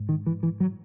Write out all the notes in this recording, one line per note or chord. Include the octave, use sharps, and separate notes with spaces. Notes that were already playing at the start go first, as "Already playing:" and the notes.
Already playing: G#2
D#3
E3
E3
F#3